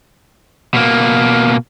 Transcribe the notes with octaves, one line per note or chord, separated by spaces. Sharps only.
B2 A#3